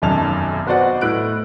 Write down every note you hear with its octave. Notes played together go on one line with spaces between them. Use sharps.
F1 B1 F#2 D#3 A5 F7
B3 F#4 C5 D5 D#5 F#5
A2 B4 F#6 D7